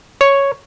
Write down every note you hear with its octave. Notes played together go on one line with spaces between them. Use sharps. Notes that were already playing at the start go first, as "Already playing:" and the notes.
C#5